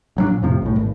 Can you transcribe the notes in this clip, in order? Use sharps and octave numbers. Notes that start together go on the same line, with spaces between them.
A1 F#3 A3 D4
A#2
F2 A2 C3 F3
B1 A2
G#1